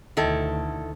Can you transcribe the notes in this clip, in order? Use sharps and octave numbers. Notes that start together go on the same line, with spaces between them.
D2 B2 D3 D#3 E4 A4